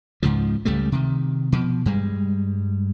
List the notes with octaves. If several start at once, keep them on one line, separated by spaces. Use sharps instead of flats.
C#2 G#2 C#3 F3
C#2 C#3 G3 A3
C3 D#3
B2 F3
G2 G3 G#3